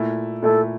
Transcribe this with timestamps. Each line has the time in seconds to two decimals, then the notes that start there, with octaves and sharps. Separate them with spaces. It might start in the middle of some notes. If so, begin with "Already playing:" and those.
Already playing: A#2 A3 E4
0.42 A#2 A3 E4 A4